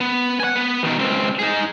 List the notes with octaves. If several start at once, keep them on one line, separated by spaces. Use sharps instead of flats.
B3
F#5 G#5
B3
B2 D#3
C#2 C4
D#4 G#4